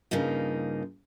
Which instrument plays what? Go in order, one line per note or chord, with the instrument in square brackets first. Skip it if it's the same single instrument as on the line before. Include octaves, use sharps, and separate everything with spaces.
[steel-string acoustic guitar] G2 C#3 F3 A#3 D#4